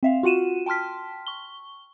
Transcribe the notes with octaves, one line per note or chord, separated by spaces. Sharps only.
C4 E5 F5
F4 F#4 F#5 D#7 E7
G5 A5 C6 F6 B6
C#6 G7